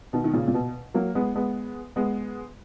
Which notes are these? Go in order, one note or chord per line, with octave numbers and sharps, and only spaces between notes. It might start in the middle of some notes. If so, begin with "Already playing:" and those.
B2 D#3
D#3
A#2 C#3
A#2
B2
F#3 A#3
G#3 B3
G#3 B3
G#3 B3